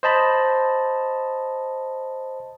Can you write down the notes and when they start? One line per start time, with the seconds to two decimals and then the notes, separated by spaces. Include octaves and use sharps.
0.03 C5 D#5 A5 B5